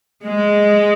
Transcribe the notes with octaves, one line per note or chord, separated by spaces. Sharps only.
G#3